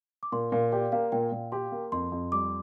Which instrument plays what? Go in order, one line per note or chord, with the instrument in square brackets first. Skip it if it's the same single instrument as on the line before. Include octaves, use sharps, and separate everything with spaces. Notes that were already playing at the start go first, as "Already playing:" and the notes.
[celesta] D6
[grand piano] A#2 [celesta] C6
[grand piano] A#2 [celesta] F5
[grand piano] G4 [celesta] D5
[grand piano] A#3 [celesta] F5
[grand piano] A#2 [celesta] G5
[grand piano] A#2
[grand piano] G4 [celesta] C6
[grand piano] A#3
[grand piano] F2 [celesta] C6
[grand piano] F2
[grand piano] G3 [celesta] D6